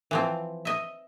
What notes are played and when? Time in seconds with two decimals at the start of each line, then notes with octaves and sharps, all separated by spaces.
0.11 E3 F3 C4
0.65 D#5 E5